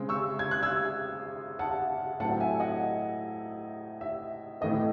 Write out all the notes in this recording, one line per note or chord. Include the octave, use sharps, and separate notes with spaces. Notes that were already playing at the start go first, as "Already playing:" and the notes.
Already playing: C#3 G#3 C4
C#6 E6
G#6
F#6
E6 G#6
F#5 A5
A2 F#3 C4 F#5 A5
E5 G#5
D#5 F#5
E5
A2 E3 A3 C4 D#5